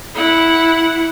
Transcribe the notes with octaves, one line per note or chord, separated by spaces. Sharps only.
E4 F#5